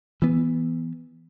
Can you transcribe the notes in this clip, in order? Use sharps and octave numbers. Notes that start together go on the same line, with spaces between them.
E3 B3